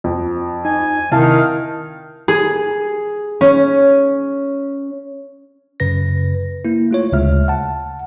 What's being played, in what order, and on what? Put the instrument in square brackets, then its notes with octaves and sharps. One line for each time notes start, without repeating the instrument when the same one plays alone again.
[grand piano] F2
[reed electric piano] D#4 [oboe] G#5
[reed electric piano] C3 E4 [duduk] D#3 [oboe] F5 [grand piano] A5
[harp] G#4
C#4
[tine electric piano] F#2 C#3 B4 A#6
A#3 E4
A3 F4 C#5
D2 C#3 G#3 E5 F6
F#5 A5